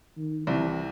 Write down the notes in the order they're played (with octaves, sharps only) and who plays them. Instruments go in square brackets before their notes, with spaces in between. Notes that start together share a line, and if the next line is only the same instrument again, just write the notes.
[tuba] D#3
[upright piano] C2 C3 [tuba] E3